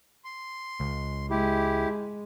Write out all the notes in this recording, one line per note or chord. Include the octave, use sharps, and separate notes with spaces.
C6
C#2
G#3 E4 G4